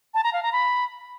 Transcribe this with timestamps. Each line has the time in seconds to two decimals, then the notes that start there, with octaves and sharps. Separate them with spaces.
0.14 A5
0.24 A#5
0.33 F5
0.43 A#5
0.52 B5